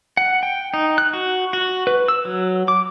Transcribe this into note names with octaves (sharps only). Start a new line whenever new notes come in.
F#5
G5
D#4
F#6
F#4
F#4
B4
E6
F#3
D6